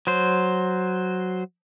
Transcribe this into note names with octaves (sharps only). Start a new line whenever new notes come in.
F#3 C5